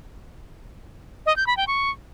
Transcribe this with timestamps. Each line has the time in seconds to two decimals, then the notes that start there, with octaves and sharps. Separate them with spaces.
1.26 D#5
1.36 G6
1.47 B5
1.57 G5
1.67 C#6